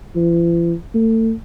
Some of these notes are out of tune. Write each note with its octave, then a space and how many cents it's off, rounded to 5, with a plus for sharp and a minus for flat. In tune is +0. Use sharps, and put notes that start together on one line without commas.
E3 +45
A3 +35